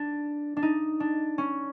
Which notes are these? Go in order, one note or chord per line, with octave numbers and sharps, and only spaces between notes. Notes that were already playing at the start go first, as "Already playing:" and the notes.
Already playing: D4
D4
D#4
D4
C#4